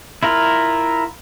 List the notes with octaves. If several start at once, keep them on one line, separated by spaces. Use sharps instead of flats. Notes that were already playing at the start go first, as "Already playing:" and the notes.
E4 F4 A#4